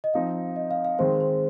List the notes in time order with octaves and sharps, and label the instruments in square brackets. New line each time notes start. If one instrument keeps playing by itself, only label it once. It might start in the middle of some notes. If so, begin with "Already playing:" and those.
[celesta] D#5
[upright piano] F3 C4 D#4 [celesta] F5
[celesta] D#5
F5
F5
[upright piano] D#3 G#3 C4 [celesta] C5
[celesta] C5